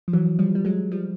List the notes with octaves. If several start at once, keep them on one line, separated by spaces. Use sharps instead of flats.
F3
E3 F#3
F3 G3
G3
F#3 G#3
F3 G3